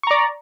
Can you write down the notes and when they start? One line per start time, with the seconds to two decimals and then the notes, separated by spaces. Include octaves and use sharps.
0.03 C#6
0.07 A#5
0.11 D5